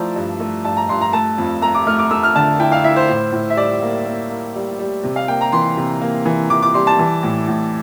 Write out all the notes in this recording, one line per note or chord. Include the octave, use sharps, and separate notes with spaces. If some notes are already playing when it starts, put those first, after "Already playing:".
Already playing: F3 A3 E4 C5 D5 A#5
G2
A3
G2 A5
A#5
G2 C6
A#5
A3 A5
F2
A3 A#5
D6
A3 F6
D6
A3 E6
F6
D3 A5
E4 G5
F5
E4 E5
C5
A2
A2
E5
G3 D5
A#3
A#3
A#3
G3
G3
C3
F5
A#3 G5
A#5
E3 C6
C3
A#3
E3
E3 D6
D6
G3 C6
A5
E3
A2
A2